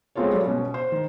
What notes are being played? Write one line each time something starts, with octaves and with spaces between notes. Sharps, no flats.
G#3 B3 C4 F4 A4 C#5
F#3 G3 G4 A4 D5
B2 C#4
C5
D#3